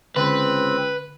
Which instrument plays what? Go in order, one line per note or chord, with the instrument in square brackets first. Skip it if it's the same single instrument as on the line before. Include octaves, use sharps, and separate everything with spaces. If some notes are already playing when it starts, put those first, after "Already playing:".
[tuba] C#2 [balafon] D3 [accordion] C4 [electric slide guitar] B4